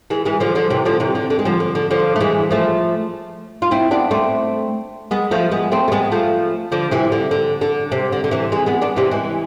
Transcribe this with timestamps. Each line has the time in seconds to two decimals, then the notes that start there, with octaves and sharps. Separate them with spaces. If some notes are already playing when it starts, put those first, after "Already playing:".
0.10 E3 G#3
0.25 E3 G#3
0.40 D3 F3
0.55 D3 F3
0.70 C3 E3
0.85 D3 F3
1.00 C3 E3
1.15 D3
1.30 D3
1.39 G#3
1.45 D3 F3
1.60 D3
1.75 D3
1.91 D3 F3
2.16 A3
2.20 E3 G#3
2.51 F3 A3
3.62 F4
3.71 C4 E4
3.91 B3 D4
4.11 A3 C4
5.11 G#3 B3
5.31 F3 A3
5.51 G#3 B3
5.72 A3 C4
5.88 A3
5.92 G#3 B3
6.12 F3 A3
6.72 D3 F3
6.91 C3 E3
7.12 D3
7.31 D3
7.61 D3
7.92 C3
8.12 D3
8.24 D3
8.31 C3 E3
8.52 E3 G#3
8.66 G#3 B3
8.82 B3 D4
8.96 C3 E3
9.11 E3 G#3